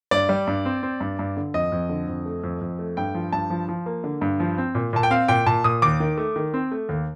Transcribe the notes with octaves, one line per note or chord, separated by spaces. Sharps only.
G2 D5
G3
G2
C4
C4
G2
G2
D3
F2 D#5
F2
D3
F2
A3
F2
F2
A3
G2 G5
F3
G2 A5
F3
F3
A#3
D3
G2
F3
C4
A#2
A#2 A5
G5
C4 F5
A#2 G5
A#2 A5
A#2 D#6
D#2 D6
D#3
A3
D#3
C4
A3
D#2